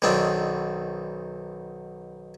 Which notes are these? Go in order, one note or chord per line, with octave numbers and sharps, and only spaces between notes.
B1 B2 D#3 C4 D4